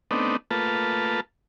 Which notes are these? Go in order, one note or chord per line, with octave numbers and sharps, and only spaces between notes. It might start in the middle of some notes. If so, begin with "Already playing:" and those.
A3 B3 C4 D4 D#4
A3 A#3 F4 B4 A5